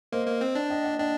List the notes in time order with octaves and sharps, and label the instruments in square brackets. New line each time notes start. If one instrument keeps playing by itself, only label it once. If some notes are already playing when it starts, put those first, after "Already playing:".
[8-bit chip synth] A#3 [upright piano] C5 D#5
[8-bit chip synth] A#3
C4
D4
[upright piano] D#5 G5
D5 F#5
[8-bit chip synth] D4 [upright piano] D#5 G5